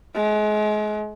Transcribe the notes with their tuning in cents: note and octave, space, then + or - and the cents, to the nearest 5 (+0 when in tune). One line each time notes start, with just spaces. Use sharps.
G#3 +35